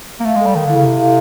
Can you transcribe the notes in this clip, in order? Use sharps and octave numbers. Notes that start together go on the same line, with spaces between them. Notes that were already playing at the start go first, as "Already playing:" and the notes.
A#3
A3 F5
G#3
G3 A4
D#3 A4
D3 E4
C#3
C3 E4
F5